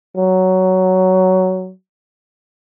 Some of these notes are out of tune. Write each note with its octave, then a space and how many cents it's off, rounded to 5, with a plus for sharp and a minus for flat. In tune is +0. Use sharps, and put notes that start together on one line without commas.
F#3 +10